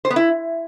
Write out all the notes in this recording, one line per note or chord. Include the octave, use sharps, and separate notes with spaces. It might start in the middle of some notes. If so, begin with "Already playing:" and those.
C5
B3
E4